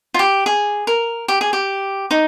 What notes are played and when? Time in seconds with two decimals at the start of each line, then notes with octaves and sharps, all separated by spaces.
0.14 F4
0.19 G4
0.46 G#4
0.87 A#4
1.28 G4
1.41 G#4
1.53 G4
2.11 D#4